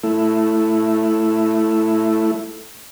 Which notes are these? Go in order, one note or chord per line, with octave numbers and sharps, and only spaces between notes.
A3 E4